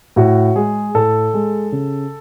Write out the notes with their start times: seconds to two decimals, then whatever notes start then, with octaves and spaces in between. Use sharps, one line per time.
0.16 A2 F#4
0.56 G#3 G#4
0.94 A2 A4
1.34 G#3
1.72 C#3